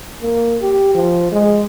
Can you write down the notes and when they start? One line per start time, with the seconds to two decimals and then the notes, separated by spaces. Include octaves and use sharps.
0.22 A#3
0.61 G4
0.95 F3
1.32 G#3